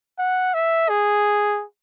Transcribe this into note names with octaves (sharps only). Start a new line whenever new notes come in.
F#5
E5
G#4